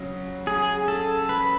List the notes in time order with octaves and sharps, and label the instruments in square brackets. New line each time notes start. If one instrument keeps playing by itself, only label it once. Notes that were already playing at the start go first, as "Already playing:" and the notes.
Already playing: [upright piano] C#3 F#3
[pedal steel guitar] G#4
A4
B4